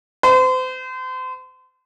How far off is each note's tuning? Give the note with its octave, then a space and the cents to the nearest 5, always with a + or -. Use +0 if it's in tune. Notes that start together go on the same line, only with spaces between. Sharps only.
C5 -35